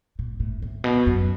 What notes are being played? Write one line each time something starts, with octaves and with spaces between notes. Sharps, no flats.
A#2
A2
A2
B2
F#2